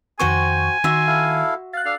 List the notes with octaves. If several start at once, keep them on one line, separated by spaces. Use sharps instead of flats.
F2 D#3 F#4 C5 G5 G#5 C#6
D#3 F#4 E5 C6
E4 A4 F5
F5 F#6 A6
D4 A4 F5